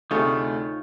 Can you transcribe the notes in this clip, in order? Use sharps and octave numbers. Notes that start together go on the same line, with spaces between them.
D2 C3 A3 D#4 F4 G#4 C#5